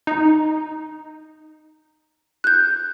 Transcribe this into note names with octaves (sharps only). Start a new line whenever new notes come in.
D#4
F#6 G6